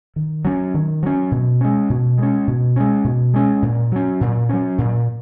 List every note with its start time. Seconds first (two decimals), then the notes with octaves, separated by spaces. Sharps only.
0.16 D#3
0.45 F#3 C#4
0.74 D#3
1.03 F#3 C#4
1.31 B2
1.61 G#3 C#4
1.90 B2
2.18 G#3 C#4
2.47 B2
2.76 G#3 C#4
3.04 B2
3.34 G#3 C#4
3.62 A#2
3.92 F#3 C#4
4.21 A#2
4.49 F#3 C#4
4.78 A#2